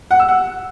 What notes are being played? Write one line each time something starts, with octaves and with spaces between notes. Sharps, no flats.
F#5
E6
F#5